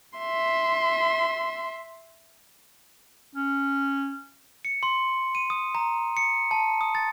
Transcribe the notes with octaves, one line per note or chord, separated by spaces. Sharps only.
E5 C6
C#4
C#7
C6
D#7
D#6
A#5
C#7
A5
D#6
A6